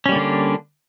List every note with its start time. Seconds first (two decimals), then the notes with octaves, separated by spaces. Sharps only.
0.06 C#4
0.09 G3
0.12 A#3
0.16 D3
0.19 D4